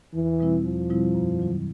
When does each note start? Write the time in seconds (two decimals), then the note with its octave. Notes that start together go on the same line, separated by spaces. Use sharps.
0.14 E2 E3
0.40 B2 G3 C4 E4
0.64 E2 F3
0.90 B2 G3 C4 E4
1.15 F#2
1.39 D#3 F#3